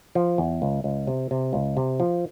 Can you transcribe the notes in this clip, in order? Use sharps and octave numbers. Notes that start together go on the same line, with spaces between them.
F3
E2
C#2
C#2
C3
C3
C#2
C3
F3